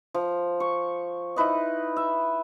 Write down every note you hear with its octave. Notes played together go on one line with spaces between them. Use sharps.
F3
C#6
D#4 E4 B4 D#5
E5